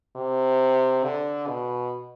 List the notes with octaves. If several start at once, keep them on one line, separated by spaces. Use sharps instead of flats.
C3
D3
B2